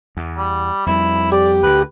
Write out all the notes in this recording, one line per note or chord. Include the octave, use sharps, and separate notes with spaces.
E2
G3
F2 G3 E4
G4 D5
D2 D3 B4